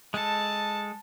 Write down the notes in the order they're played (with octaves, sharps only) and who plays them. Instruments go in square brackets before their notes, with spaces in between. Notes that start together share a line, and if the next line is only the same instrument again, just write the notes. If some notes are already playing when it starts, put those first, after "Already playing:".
[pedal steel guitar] G#3 A4 [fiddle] A5